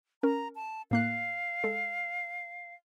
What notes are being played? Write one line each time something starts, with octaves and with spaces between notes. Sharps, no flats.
C#4 A#4 A#5
A5
A2 A#3 F5 F#6
G#3 A4